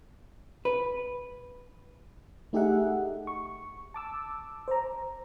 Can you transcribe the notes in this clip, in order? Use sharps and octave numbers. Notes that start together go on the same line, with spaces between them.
B4
A3 D#4 G4 G#4 E5 F#5
C#6
A5 D6 E6
C5 A#5